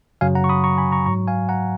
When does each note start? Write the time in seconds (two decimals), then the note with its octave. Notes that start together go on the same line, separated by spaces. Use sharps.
0.21 F#2 C#3 F#3 F5 G#5
0.35 F#5 A#5
0.44 C#6
0.49 B5 D#6
0.64 A#5 C#6
0.78 G#5 B5
0.92 A#5 C#6
1.06 G#2 F#3 A#5 C#6
1.28 F5 G#5
1.49 F#5 A#5